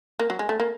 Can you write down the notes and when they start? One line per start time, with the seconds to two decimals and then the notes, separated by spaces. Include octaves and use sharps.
0.19 A#3
0.30 F#3
0.39 G#3
0.49 A3
0.60 A#3